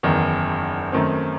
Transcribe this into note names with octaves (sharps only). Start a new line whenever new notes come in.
F#1 E2 D#3
F#2 D#3 A3 C4